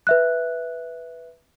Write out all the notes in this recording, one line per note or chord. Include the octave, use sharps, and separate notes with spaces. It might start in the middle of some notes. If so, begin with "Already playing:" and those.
B4 E5 F#6